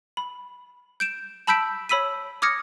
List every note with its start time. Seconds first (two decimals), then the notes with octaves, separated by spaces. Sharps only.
0.17 B5
1.00 G6 D7 E7
1.47 A5 B5 E6 G6 B6 D7
1.89 C#5 B5 E6 B6 D#7
2.42 D6 D#6 F6 G#6 A#6 C#7